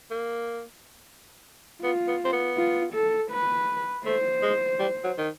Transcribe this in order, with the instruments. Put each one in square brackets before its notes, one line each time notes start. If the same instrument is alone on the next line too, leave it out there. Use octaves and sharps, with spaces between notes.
[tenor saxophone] A#3
[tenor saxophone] B3 [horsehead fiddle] F4
[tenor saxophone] B3
C4
B3
[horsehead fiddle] F4
A4
B4
[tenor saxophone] A3 [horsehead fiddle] C5
[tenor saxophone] G#3
G3
F#3
D#3